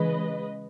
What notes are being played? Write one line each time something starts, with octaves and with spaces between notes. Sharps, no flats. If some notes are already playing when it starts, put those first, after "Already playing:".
Already playing: C#3 E3 G#3 B4 D#5